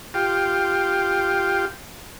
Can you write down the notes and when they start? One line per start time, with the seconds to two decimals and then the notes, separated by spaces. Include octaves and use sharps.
0.14 F4 G4